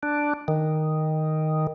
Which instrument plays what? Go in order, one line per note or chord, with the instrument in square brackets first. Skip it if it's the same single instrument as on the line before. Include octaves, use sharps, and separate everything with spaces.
[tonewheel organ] D4
D#3